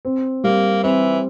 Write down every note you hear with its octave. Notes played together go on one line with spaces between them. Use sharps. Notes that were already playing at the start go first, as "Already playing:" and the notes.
C4
G3 A#3
E3 C4